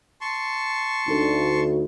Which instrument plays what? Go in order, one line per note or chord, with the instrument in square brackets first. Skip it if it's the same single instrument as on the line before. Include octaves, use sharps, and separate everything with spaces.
[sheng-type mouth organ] A5 C6 C#6
[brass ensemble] D2 [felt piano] D#4 A4